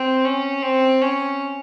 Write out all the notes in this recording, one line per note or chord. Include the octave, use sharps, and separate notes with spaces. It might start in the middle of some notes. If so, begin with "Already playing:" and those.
Already playing: C4
C#4
C4
C#4